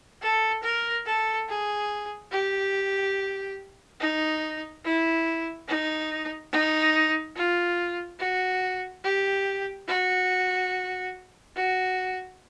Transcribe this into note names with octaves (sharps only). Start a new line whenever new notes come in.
A4
A#4
A4
G#4
G4
D#4
E4
D#4
D#4
F4
F#4
G4
F#4
F#4